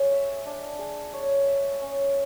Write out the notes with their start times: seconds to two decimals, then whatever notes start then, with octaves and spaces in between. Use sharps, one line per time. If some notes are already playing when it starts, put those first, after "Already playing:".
Already playing: G#4 C#5
0.12 E5
0.46 D4
0.79 G#4
1.14 C#5
1.47 E5
1.81 C#4